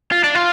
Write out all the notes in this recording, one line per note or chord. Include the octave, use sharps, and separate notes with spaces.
F4
D4
F4